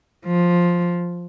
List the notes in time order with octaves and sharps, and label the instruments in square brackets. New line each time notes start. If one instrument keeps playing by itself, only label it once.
[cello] F3